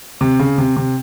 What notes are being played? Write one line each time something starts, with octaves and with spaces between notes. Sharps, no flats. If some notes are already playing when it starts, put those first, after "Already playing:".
C3
C#3
C3
C3